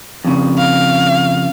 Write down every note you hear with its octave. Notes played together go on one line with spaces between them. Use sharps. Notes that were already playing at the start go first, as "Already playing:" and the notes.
F2 C#3
F5